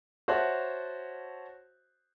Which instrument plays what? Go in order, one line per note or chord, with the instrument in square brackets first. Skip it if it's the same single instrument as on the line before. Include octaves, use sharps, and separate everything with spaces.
[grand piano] F#4 C5 C#5 E5 A5 F#6